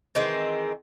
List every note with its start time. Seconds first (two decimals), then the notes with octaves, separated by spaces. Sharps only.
0.15 D#3 E3 G#3 C4